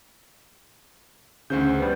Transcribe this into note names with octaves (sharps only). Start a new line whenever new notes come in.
D2 C#3 C5 G6
G3 B3